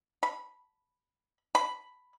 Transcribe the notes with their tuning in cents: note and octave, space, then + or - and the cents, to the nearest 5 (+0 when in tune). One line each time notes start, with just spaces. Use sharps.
B5 -5
B5 +5